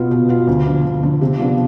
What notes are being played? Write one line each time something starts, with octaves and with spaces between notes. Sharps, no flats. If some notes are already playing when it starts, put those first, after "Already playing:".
Already playing: B2 B3 F4
B2
B3 F4
D2
D3 F3
D2
D3 F3
C3
F3 B3 D4